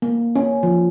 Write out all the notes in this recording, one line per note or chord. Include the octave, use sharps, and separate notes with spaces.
A#3
C#4
F3